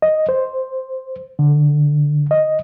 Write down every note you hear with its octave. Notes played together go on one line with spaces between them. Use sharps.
D#5
C5
D3
D#5